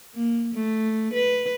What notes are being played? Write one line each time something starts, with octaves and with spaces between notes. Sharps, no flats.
A#3
A3
B4